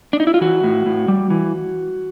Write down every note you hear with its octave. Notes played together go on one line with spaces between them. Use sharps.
D4
D#4
E4
F4
E3 F#4
A2
A2
G3
E3